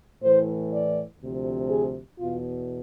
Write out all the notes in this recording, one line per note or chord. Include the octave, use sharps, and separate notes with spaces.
A2 E3 C5
D5
D2 C3 F3
G#4
E2 B2 F4